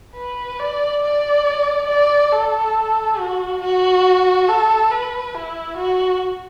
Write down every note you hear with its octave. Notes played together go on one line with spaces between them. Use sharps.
B4
D5
D5
D5
A4
F#4
F#4
A4
B4
E4
F#4